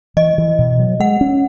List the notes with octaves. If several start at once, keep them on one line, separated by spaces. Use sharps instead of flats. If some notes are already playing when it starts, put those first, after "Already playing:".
E3 D#5
E3
B2
F#3
G#3 F#5
C#4